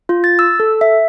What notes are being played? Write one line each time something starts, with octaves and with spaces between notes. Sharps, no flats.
F4
A6
E6
A4
E5